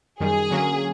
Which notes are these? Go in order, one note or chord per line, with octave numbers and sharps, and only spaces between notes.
F#2 D#3 G3 G#4
D3 F#3 A#3 C#4